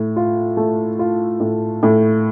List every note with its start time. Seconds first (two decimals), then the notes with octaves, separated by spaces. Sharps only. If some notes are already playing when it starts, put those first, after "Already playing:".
Already playing: A2
0.16 F4
0.57 A3
0.99 F4
1.40 A2
1.83 A2